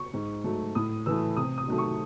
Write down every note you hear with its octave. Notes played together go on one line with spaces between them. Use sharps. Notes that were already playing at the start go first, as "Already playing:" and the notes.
Already playing: C#6
G#2
F#3 A3
A2 D#6
E3 A3 E6
C3 D#6
D#6
D#3 F#3 A3
C#6